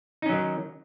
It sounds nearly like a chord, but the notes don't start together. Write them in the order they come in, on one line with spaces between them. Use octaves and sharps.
D#4 C#4 F#3 D#3